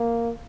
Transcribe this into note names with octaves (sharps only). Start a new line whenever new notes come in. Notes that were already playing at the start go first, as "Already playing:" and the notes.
Already playing: A#3